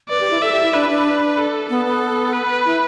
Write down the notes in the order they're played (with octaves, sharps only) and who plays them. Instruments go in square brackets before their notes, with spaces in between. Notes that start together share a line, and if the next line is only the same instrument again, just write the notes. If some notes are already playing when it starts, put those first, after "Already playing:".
[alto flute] B4 [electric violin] D5
[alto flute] G4
E4
[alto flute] A4 [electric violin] E5
[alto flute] G4
E4
[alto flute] D4 [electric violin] B4
[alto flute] D4
[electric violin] A4
[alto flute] B3 [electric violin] A4
[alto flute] B3
[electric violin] B4
[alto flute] E4